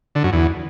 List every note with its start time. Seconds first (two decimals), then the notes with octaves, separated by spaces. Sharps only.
0.15 D3
0.24 F#2
0.33 E2